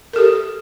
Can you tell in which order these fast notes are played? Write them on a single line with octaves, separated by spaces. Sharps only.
A#4 A4 G4